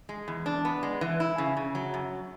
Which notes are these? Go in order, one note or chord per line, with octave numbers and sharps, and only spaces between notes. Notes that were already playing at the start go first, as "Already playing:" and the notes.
G#3
E2
D4
B3
G#3
E3
E4
C#3
C#3
F#3
F#2